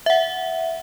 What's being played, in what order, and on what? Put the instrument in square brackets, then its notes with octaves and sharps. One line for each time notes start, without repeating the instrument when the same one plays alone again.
[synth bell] E5 F#5